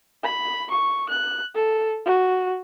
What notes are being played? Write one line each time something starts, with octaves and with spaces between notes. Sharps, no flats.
B5
C#6
F#6
A4
F#4